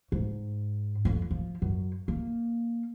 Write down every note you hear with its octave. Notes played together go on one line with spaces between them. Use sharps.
G#2
F2
F3
F#2
A#3